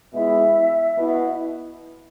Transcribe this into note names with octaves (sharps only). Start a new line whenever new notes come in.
B2 G#3 B3 E4 E5
B2 B3 E4